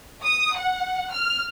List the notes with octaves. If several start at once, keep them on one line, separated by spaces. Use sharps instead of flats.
D#6
F#5
F6